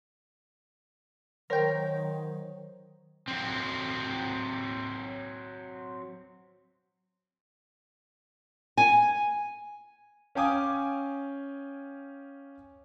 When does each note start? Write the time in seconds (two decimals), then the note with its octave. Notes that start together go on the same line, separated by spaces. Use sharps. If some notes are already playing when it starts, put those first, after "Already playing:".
1.50 D#3 F#3 A#4 C5 C#5 G5
3.28 F#3 C4
8.77 G#5
10.35 C#4 F5 G5 G#5 D6 D#6